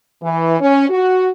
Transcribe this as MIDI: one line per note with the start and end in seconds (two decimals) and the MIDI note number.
0.22 0.56 52
0.60 0.88 61
0.89 1.29 66